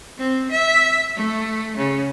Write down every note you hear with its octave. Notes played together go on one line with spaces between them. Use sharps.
C4
E5
A3
C#3